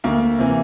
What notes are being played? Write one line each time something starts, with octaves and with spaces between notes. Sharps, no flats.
D2 A#3
C3 E3